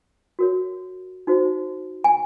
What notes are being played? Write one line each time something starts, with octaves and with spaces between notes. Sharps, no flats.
F#4 A#4 C#5
D#4 F#4 C5
G#5